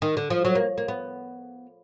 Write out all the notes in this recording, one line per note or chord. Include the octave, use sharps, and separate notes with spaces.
D#3
D3
F3
F#3
A#3
A#3
B3